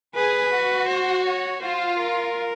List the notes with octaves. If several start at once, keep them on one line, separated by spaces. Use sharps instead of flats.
G#4 B4
F#4
C5
C#5
F4 C5
A#4